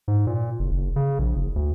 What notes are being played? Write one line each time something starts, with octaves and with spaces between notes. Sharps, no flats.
G#2
A#2
F#1
F#1
C#3
A#1
F#1
D2